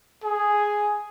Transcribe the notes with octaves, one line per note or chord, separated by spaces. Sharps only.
G#4